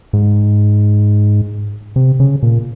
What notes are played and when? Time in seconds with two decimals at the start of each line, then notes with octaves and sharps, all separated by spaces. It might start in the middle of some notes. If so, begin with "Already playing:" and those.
0.13 G#2
1.96 C3
2.20 C#3
2.43 A#2